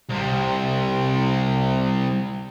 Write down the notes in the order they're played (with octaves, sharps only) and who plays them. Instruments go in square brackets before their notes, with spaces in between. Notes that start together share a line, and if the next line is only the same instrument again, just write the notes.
[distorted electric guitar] C2 C3